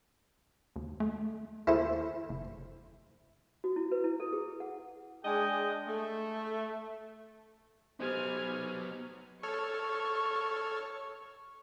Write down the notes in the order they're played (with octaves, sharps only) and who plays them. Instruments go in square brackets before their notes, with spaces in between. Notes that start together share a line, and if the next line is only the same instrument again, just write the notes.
[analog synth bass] D#2
A3
[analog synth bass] D#2 [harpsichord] E4 A4 C5
[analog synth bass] F#1
[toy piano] F#4
E4
B4
E4
A4
G#4
F#5
[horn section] G#3 D4 G#4 D#5 G5 G#5
A3
[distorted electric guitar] B3 D#4 [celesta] G4 C5 [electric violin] G#5 F6
[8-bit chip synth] A4 C#5 F6 [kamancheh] C#6